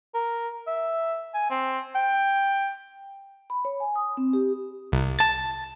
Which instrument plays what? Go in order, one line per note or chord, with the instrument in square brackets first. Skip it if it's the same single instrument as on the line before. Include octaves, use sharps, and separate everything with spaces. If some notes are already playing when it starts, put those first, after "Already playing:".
[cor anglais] A#4
E5
G#5
C4
G5
[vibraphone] B5
C#5
G#5
D#6
C4
G4
[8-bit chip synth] C2
A5 A6